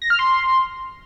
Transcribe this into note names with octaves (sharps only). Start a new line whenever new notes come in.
A#6
F6
C6